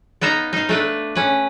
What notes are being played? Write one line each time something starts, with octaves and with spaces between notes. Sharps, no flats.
B3 D#4 F5 A#5
D#4 F5
A3 D4 B4
C#4 B4